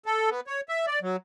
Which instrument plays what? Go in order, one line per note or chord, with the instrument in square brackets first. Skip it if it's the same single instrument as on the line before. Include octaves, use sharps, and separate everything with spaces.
[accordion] A4
B3
C#5
E5
D5
F#3